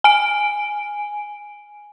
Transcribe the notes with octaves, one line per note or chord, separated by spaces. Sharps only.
G#5 D7